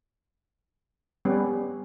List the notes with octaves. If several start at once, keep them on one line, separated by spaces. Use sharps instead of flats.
G3 B3 C#4